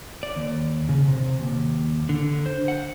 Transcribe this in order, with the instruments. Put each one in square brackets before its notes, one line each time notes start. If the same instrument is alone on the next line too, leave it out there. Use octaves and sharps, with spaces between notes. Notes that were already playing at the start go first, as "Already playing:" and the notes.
[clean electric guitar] D5
D#2
C#3
C3
D#2
D3
C5
F#5